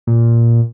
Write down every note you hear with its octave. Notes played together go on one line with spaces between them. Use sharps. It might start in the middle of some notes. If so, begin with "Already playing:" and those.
A#2